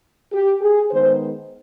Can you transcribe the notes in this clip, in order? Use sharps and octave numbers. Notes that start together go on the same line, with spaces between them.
G4
G#4
D#3 G#3 B3 C5